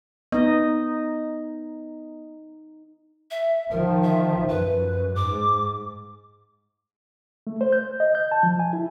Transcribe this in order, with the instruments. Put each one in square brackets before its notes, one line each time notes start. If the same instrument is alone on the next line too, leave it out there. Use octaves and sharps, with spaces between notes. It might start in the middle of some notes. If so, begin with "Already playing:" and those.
[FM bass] B3 [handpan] D#4 D#5
[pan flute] E5
[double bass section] D#3 F3 [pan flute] A#4
[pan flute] E5
[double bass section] F#2 [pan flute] B4
[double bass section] G#2 [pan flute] D6
[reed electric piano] A3
C5
G6
D#5
G6
A5
F3
G#5
E4